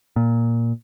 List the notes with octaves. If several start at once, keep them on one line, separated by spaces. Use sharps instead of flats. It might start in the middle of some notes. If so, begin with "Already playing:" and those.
A#2